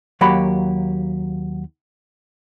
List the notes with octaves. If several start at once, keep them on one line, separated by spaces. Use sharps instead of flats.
D#2 F#3 A#3 F#4 G4 B5